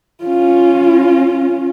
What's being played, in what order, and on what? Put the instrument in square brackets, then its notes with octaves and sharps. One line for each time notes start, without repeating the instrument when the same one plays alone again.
[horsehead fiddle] C#4 F4